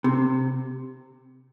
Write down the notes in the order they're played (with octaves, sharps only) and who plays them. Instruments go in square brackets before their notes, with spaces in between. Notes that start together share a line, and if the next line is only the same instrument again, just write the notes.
[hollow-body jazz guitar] C3